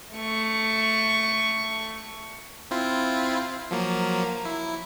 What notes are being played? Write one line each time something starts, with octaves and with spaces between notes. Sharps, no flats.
A3 C#6
C4 E4 F4
F3 F#3 A#3
E4